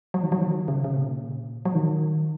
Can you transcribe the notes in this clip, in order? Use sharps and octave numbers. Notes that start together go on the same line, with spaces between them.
F#3
D#3
F#3
D#3
C#3
C#3
A#2
F#3
D#3